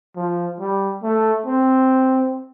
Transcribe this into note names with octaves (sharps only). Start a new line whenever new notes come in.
F3
G3
A3
C4